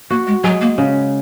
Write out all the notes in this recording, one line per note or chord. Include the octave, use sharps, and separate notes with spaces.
A#3 F#4
G#3
F#3 G#3
A#3
C#3